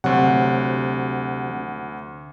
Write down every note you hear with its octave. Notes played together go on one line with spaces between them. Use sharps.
D2 C3 F#3 F#4 F#5